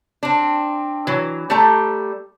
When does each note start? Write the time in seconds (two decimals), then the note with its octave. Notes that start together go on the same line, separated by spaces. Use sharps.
0.23 C4 D4
1.07 E3 F#3
1.50 G3 A3 G4 A4 D5 A#5